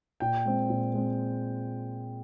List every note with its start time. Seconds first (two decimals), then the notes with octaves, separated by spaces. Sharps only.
0.20 A#2 G5
0.45 G#3 C4
0.70 A#2
0.94 G#3 C4